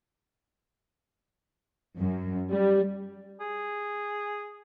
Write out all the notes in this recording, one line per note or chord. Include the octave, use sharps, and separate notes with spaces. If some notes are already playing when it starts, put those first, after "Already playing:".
F#2
G3
G#4